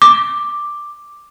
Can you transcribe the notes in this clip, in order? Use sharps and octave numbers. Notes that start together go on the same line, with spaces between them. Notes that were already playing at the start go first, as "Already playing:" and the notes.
D6